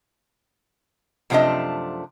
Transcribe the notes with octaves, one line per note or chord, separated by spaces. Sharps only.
F#2 C3 F3 A3 D4 D#5